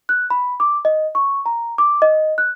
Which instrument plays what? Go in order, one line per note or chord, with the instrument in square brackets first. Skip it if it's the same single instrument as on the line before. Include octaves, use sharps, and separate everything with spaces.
[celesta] F#6
B5
D6
D#5
C#6
A#5
D6
D#5
F#6